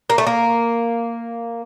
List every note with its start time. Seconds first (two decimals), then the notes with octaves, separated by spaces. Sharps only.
0.10 A#3
0.18 A3
0.27 A#3